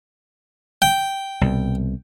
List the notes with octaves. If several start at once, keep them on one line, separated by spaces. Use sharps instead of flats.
G5
C2 B2